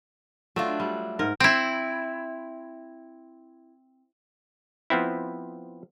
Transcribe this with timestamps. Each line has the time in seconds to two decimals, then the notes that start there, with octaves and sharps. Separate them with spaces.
0.56 F#3 A3 D4 F4
0.80 G3
1.19 G#2 A#4
1.40 C4 E4
4.90 F3 B3 C4 E4